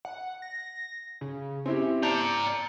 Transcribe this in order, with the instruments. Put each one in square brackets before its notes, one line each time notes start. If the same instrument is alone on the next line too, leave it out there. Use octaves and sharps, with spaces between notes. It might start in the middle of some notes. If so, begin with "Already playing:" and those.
[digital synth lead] F#5
A#6
C#3
[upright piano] C4 E4 G4 [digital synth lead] C#4
[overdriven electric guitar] D5 A#5 [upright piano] A5 G6 [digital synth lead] C#7